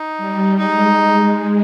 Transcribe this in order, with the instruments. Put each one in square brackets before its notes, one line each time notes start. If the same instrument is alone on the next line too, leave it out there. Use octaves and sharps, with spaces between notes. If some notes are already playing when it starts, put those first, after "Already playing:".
Already playing: [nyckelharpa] D#4
[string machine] G3
[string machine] G#3 [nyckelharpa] D#4